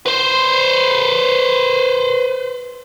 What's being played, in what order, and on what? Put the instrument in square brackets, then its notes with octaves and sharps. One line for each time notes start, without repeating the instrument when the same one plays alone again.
[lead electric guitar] B4 C5